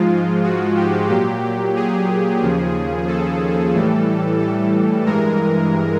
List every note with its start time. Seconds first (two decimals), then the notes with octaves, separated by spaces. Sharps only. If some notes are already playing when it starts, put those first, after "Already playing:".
Already playing: G#2 F3 G#3 F4
0.44 F#4
0.77 G4
1.10 A#2 F#3 G4
1.76 G#4
2.42 D#2 C#3 F3
3.08 A4
3.74 A2 E3 G3
4.40 A4
5.06 G2 E3 G#3 A#4